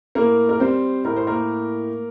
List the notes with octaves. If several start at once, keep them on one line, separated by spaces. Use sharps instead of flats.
A2 A#3 A#4
A#4
G3 C4 C5
A2 A#4
C5
A#3 A#4